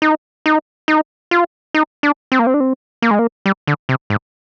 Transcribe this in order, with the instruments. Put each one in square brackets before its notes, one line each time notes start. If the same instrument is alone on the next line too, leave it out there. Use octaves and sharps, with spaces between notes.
[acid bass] D#4
D#4
D#4
F4
D#4
D4
C4
A#3
C4
D4
C4
A#3
G#3
A#3
G3
D3
C3
G#2